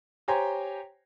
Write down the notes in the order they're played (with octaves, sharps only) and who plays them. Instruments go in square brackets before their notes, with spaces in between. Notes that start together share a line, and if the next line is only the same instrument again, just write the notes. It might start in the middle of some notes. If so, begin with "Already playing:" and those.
[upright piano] G4 C5 C#5 G5 G#5 A#5